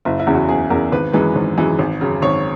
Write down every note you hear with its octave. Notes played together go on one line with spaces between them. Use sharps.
F#1 E4
E4
E2 C#3
F#4
F#1 G#4
E2 C#3 A#4
G#1 B4
F#2 E3 G#3 B4
G#1
F#2 E3 G#3
G#1
F#2 C#3
G#1 C#5